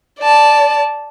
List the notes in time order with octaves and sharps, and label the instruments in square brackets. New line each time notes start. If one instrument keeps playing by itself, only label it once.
[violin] D5 A5